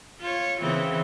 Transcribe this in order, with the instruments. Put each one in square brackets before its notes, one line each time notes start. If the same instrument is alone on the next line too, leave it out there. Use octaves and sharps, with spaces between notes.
[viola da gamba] F4 C#5
C#3 E3 C4